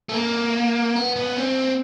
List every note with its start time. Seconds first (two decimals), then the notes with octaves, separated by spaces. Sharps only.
0.09 A3
0.13 A#3
0.96 B3
1.16 B3
1.37 C4